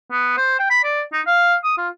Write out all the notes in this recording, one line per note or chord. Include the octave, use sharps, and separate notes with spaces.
B3
C5
G5
B5
D5
D#4
F5
D#6
F4